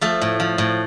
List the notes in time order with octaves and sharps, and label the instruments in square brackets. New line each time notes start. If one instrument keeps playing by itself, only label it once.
[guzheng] F3 A3 A4
A2
F3
A2